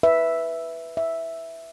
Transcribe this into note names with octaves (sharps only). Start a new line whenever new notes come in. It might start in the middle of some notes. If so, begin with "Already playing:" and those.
B4 E5
E5